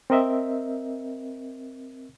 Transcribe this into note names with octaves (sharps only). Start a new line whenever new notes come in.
C4 A#4 D#5 E5